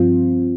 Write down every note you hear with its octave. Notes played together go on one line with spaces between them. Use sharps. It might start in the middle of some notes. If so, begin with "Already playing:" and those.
Already playing: G2 F3 C4 F4